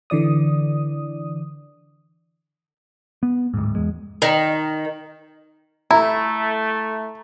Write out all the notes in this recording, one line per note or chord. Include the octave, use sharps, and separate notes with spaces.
D3 E3 D5 D#6
B3
D1 G#2
E2 G#3
D#3
A3 E4 A#5